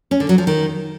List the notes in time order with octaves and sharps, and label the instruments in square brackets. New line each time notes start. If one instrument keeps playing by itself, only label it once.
[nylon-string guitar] C#4
D3
F#3
F3
D#3